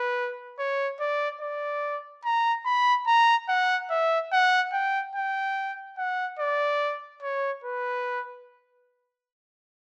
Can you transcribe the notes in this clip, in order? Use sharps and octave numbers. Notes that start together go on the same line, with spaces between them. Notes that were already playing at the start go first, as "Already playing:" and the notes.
Already playing: B4
C#5
D5
D5
A#5
B5
A#5
F#5
E5
F#5
G5
G5
F#5
D5
C#5
B4